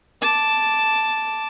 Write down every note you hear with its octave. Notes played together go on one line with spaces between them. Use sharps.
A5 D6